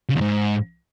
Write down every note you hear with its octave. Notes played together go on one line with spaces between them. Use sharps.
C#3
E2
G#2